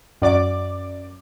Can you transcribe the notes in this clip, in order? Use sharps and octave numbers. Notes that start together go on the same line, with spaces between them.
F#2 D5 D6